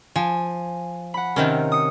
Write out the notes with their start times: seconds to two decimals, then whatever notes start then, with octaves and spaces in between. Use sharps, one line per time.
0.16 F3 G#5
1.14 F#5 B5
1.36 C3 D#3 C4 C#4 A#4
1.72 D#6 C#7